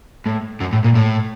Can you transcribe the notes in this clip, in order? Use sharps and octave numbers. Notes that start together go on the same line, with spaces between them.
A2
F#2
A2
A#2
A2